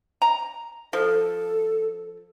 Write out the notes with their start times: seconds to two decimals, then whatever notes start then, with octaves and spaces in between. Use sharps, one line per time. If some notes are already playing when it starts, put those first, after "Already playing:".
0.22 A#5
0.93 F3 A4